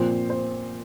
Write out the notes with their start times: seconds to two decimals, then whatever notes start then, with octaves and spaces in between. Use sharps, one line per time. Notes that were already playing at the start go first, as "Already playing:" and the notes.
Already playing: A#2 F3 C4 C5
0.30 C5